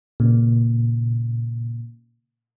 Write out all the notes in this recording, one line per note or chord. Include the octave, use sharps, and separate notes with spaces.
A#2 C#3